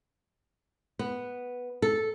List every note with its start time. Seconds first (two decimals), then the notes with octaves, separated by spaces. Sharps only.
0.99 B3
1.82 A4